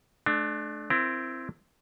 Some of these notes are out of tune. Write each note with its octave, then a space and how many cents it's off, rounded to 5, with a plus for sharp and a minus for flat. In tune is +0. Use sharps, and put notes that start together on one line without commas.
A3 -35 D4 +20
C4 +0 E4 +25 A#4 +15